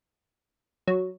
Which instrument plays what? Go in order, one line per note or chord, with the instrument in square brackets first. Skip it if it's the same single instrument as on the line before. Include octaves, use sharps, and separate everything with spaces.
[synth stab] F#3